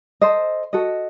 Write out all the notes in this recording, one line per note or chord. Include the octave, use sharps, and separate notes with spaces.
A4 C5 D#5
F#4 A4 D#5